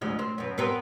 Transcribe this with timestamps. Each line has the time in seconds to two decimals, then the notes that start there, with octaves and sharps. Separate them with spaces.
0.01 D2 F3 G#3
0.19 C4
0.38 F#2 B2
0.58 B3 C4 A#4